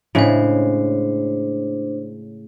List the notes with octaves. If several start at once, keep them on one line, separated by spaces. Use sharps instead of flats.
A2 C#3 G#3 D4 C5